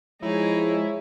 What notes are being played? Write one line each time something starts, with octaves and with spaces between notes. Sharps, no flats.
F3 G#3 D#4 E4 G#4 C#5